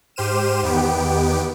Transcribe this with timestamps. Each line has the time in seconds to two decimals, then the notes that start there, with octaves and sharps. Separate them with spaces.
0.16 G#2 G4 C5 F6 D#7 E7
0.63 E2 D#3 B3 G4 D7